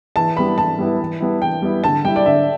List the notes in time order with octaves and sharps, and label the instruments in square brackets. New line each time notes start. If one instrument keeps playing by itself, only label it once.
[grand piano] E3 [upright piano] A5
[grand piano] G3 B3 E4 [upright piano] B5
[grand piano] E3 [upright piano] A5
[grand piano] G3 B3 E4
E3
G3 B3 E4
[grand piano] E3 [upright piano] G5
[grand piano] G3 B3 E4
[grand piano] D3 [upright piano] A5
[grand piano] G3 E4 [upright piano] G5
[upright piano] D5
[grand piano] D3 [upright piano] E5